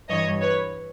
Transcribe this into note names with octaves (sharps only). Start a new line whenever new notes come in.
G2 E3 C#5 D#5
B4 C#5